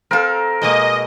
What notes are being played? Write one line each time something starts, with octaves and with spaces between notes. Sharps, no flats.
C4 A4 A#4 F5
B2 G#3 A#3 D#5